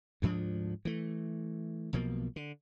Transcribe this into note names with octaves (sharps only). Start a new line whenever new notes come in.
D2 G#2 F3 D4
E3 A3
B1 B2 F3 A#3
D3